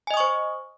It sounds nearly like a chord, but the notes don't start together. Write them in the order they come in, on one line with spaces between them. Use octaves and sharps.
G#5 D#5 D#6 C#6 C5